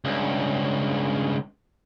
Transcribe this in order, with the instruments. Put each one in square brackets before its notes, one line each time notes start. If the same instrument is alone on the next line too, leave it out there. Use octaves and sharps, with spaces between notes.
[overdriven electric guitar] C#2 G2